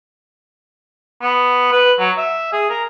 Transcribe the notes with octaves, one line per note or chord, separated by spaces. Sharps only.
B3
B4
F#3
E5
G#4
A#4